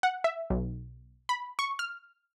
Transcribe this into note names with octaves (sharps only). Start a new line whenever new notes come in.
F#5
E5
B1
B5
C#6
F6